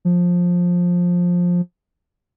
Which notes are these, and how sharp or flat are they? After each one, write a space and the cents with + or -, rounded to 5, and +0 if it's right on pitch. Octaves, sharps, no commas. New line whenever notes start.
F3 +15